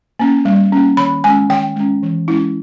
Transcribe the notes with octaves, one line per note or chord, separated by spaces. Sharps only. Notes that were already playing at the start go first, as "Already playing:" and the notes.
A#3 C#4
G3
A#3 C#4
D#3 B5
G#3 C#4 G#5
D#3 G5
G#3 C#4
E3
G#3 C#4 E4